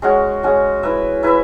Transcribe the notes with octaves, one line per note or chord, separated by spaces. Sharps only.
G#3 C#4 F#4
G#3 C#4 F#4
E4 B4 E5
E4 B4 E5